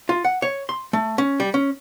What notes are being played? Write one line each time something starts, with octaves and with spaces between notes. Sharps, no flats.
F4
F#5
C#5
C6
A3
C#4
G3
C#4